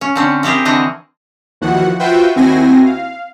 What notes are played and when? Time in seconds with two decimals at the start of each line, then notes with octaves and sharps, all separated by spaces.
0.01 C#4
0.15 D3 C4 C#4
0.43 C4 E4 G4 G#4 A#4
0.65 D3 E3 C4 F#4 D#5
1.61 D#2 E3 F3 F#4 F#5
1.99 F4 F#4 B4 C5 E5 G5
2.36 D#2 C4 E4 F#4 G#5 A#6
2.85 F5